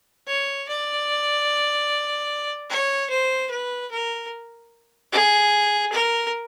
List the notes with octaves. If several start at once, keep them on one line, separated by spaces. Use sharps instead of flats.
C#5
D5
C#5
C5
B4
A#4
G#4
A#4